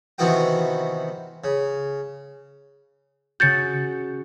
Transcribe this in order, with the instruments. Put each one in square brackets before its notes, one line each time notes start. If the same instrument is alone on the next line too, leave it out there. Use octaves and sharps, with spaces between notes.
[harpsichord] C3 D#3 E3 B3 F#4 G5
C#3
[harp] C#3 F#4 [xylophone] G6 A6 C#7